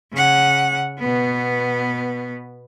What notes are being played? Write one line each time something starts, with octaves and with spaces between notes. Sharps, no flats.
C#3 F#5
B2 B3